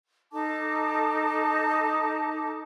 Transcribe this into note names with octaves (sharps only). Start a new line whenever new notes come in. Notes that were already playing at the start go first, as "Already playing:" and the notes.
D#4 A4 A5 D6